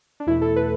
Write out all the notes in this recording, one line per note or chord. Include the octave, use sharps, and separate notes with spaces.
D4
E2 B2 A3 E4
A4
B4